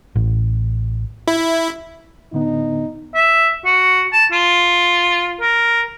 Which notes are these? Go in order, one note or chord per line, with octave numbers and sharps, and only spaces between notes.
A1
E4
A2 D3 B3 D#4
E5
F#4
A5
F4
A#4